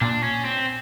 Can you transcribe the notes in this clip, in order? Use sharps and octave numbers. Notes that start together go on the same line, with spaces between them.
A#2 D4
C#4
C4